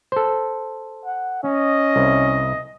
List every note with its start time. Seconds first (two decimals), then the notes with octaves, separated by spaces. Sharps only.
0.12 A4 C5
1.05 F#5
1.43 C#4 D#5
1.96 C2